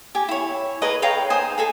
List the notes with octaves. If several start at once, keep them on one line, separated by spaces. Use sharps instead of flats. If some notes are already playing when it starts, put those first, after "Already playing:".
G4 G#5
E4 C#5
G#4 A#4 B4 D#5
C#5 F5 G5 A#5
D#4 C5 G#5 D#6
G#4 A4 G#5